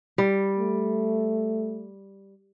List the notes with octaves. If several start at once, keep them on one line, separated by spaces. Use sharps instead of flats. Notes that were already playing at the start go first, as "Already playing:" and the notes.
G3
A3